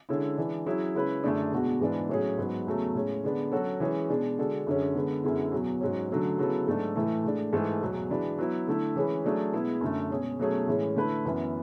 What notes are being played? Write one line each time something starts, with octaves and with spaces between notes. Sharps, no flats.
D3 G#3 C#4 E4
E3 G#3 D4
F#3 C#4 E4 G#4
C#3 G#3 C#4 E4 B4
F#2 D3 A3 D4 G#4
E2 B2 G#3 D4 F#4
G#2 E3 G#3 B3 D4
A2 F#3 C#4 G#4
G#2 F#3 B3
E2 C#3 F#3 A3
A2 G#3 C#4
D3 G#3 B3 D4
F#3 C#4 F#4 A4
E3 G#3 C#4 G#4
B2 G#3 D4
D3 G#3 D4 F#4 A4
F#2 D3 G#3 C#4
D3 G#3 B3
F#2 D3 G#3 B3 E4
E2 B2 F#3
G#2 F#3 C#4
D3 F#3 A3 C#4
C#3 F#3 B3 E4 A4
G#2 F#3 A3 D4 A4
A2 E3 A3
A2 G#3 D4
G#2 E3 A3
E2 B2 F#3
E3 G#3 D4 F#4 B4
F#3 B3 E4
D3 A3 E4
E3 G#3 C#4 G#4 B4
F#3 A3 D4 G#4
B2 G#3 B3 E4 G#4
F#2 D3 A3
B2 G#3 C#4 G#4
B2 F#3 A3 C#4 G#4
A2 E3 G#3 C#4
D3 A3 E4 B4
F#2 E3 B3